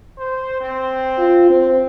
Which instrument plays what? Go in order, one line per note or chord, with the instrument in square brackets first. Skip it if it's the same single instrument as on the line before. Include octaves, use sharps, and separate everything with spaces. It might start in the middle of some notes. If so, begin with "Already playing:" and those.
[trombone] C5
C4
[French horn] F4
C4